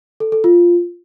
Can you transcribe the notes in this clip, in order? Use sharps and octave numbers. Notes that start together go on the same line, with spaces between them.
A4
A4
F4